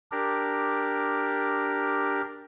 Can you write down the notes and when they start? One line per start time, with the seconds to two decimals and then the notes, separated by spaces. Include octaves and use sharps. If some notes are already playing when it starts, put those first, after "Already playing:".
0.12 D4 G4 A#4